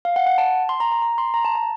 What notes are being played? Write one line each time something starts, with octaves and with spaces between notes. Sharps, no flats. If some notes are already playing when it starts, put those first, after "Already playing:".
F5
F#5
F#5
A5
C6
A#5
A#5
A#5
C6
A#5
A5
A5